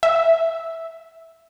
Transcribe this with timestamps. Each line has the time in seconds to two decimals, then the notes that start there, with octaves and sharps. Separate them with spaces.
0.03 E5